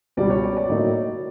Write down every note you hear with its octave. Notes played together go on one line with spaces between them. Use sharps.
C#2 B2 G3 D5
C#5
D5
D5
A2 F#3 A#3 D#4